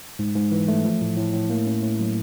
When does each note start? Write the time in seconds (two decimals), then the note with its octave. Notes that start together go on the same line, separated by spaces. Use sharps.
0.19 G#2
0.35 G#2
0.52 E3
0.68 A3
0.84 F3
1.01 A2
1.17 A2
1.33 A2
1.50 A#3
1.66 C#4
1.83 A2
1.99 F#3